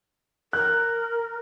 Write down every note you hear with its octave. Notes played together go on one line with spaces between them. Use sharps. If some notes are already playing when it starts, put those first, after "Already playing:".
A#4 F#6